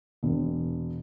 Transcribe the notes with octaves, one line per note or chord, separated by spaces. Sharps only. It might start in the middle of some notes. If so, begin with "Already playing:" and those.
E1